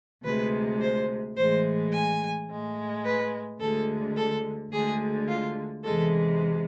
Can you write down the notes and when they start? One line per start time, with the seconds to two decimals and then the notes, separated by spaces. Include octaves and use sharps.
0.24 D2 C3 G#3 B4
0.81 C5
1.36 A2 E3 G#3 C5
1.92 G#5
2.49 A2 G#3
3.04 B4
3.60 D2 D3 G#3 A4
4.15 A4
4.71 D2 D3 G#3 G#4
5.27 F4
5.83 E2 C3 E3 G#3 A4